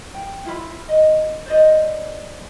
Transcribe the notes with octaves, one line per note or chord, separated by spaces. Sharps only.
G5
E4 F4 A4 B5
D#5
C5 D5 D#5